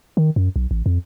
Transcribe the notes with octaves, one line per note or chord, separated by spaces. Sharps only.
D#3
F#2
B1
A1
F2